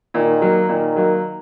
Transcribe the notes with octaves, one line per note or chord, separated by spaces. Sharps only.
A#2 D#3
F#3 A#3
A#2 D#3
F#3 A#3